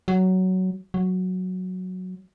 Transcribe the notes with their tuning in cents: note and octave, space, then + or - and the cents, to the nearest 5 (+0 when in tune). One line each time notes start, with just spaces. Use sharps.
F#3 +10
F#3 -5